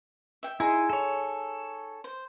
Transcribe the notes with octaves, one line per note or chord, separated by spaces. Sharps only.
E5 G5
D#4 E4 G#4 C6
A4 C#5
C5